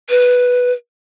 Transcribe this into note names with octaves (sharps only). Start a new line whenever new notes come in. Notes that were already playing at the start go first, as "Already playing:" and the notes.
B4